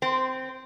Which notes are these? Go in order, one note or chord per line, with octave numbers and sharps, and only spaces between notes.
C4